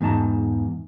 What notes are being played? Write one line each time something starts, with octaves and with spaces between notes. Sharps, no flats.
E2 G#2 D#4 A5 A#5